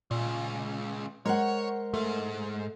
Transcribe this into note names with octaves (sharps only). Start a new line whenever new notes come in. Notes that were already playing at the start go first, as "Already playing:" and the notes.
C#2 A#2 C#3
G#3 A#4 C5 C#5 F#5
G#2 A3